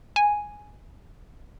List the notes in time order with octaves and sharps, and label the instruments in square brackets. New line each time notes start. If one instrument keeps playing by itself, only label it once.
[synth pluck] G#5